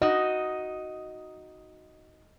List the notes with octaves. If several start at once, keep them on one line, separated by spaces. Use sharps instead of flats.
D#4 F#4 D#5